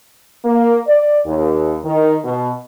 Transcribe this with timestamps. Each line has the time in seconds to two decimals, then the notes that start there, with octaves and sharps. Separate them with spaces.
0.45 A#3
0.87 D5
1.27 D#2
1.85 D#3
2.25 B2